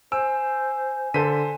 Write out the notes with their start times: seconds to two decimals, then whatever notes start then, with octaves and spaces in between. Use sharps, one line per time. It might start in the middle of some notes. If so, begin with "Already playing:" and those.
0.12 C5 G#5 E6
1.14 D3 A4 C5 B6 D#7